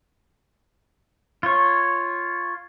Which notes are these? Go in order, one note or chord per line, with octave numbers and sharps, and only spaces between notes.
F4 C#5